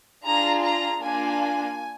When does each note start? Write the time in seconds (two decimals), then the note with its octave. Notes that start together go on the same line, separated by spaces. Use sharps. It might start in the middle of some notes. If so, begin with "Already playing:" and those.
0.24 D4 F4 G#4 A#5
0.63 A#5
1.01 A#3 D4 F4 G#5